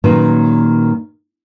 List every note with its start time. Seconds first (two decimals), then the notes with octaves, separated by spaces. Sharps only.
0.04 A#2 D#3 F#3 A#3 C#4 B4